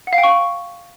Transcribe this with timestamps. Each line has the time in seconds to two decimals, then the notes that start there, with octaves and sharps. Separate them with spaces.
0.07 F#5
0.13 F5
0.18 G5
0.23 C#6